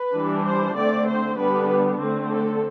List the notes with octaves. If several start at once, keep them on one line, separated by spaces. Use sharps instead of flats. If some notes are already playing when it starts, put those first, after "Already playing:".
Already playing: B4
E3 G3 D4
C5
D3 A3 C4 D5
C5
D3 G3 B3 D4 B4
D3 A3 C4
A4